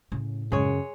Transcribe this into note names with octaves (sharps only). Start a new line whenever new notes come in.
A2 C#3
F#2 C#3 G#3 C#5